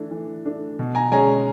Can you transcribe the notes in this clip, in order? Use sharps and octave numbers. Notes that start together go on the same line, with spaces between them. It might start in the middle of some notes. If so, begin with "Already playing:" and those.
Already playing: E3 A3 D4
E3
A3 D4
B2
G#5 A#5
G#3 C#4 G#5 A#5